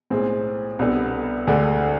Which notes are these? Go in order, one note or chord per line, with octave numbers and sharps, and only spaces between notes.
B1 A2 G#3 C4 G#4
C2 B2 B3 D4 A4
D2 D3 G#3 D4 A4